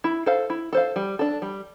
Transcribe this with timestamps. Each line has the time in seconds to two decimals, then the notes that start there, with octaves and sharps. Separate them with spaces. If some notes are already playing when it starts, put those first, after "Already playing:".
0.04 E4
0.26 A4 C5 F5
0.50 E4
0.73 A4 C5 F5
0.96 G3
1.19 D4 A4
1.42 G3